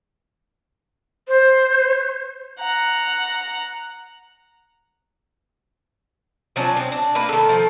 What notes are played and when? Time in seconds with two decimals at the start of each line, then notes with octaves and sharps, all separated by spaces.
1.28 C5
2.60 F#5 A#5
6.56 F3 F#3 C#4 D4
6.77 C4
6.92 D4
7.15 A#3 B4
7.29 D#3 A4
7.49 F3